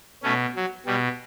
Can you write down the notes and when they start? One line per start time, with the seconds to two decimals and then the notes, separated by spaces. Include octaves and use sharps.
0.23 B2 A3 C#4
0.56 F#3
0.86 B2 G3